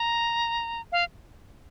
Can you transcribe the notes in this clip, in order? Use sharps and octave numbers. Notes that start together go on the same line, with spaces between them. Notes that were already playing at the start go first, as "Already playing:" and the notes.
Already playing: A#5
F5